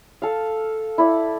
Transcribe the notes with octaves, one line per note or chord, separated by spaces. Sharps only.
A4 F5
E4 D5